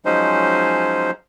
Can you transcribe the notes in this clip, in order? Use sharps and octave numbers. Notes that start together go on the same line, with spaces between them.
F3 F#3 G#3 C#4 D#4 C5